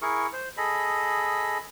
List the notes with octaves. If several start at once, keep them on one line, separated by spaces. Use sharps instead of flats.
E4 G#4 A#4 C#6
C5
G#4 A4 D#5 B5